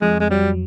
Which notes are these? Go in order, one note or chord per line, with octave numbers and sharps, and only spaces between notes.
F2 G#3
G#3
F#3 G3